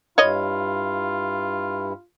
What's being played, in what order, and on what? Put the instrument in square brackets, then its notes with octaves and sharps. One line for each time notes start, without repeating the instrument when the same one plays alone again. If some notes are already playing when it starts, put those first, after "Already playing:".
[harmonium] G2 E4 [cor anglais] F4 [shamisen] C#5 D#5